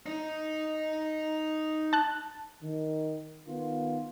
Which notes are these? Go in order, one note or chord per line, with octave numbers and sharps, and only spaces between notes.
D#4
A5 F#6
D#3
D#3 B3 F4